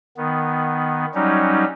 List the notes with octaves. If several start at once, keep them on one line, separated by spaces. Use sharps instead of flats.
D#3 B3
F#3 G3 C#4 D#4